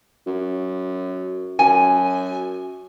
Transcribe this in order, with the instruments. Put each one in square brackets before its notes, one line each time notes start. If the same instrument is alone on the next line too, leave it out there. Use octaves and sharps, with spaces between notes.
[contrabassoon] F#2
[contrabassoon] F#2 [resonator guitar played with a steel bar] G#5